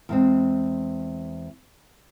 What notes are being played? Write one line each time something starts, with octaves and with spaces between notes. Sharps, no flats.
E2 G#3 C4